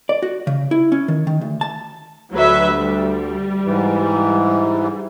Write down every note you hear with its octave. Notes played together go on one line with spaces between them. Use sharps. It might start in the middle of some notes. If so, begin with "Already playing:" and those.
D5
F#4
C#3
E4
C#4
D#3
D#3
D2
A5
D2 F#3 B4 E5
G3
G#2 E3